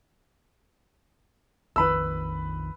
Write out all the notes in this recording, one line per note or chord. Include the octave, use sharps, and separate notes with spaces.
A#1 F2 D#3 B4 B5 E6